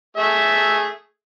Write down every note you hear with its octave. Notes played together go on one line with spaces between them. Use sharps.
A3 G#4 E5